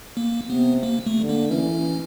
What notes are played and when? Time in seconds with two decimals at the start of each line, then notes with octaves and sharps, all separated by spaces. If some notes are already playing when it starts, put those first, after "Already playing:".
0.17 A#3
0.50 C3 B3
0.83 A#3
1.06 A3
1.17 D3
1.29 A#3
1.51 E3 C#4